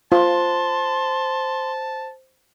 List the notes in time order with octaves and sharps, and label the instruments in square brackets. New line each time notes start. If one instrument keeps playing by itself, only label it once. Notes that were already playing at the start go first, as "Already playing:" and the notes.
[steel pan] F4 [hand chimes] C5 [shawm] A5 [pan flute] C6